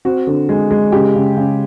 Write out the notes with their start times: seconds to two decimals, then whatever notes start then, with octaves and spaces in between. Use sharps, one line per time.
0.05 C4 F#4
0.27 D3
0.49 G#3
0.71 G#3
0.92 C#3 G4
1.15 C#3
1.37 C#3